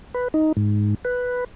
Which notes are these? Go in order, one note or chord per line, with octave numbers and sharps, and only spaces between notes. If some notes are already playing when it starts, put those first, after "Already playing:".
B4
D#4
G#2
B4